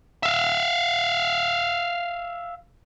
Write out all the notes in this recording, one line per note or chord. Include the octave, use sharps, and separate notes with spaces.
E5 F5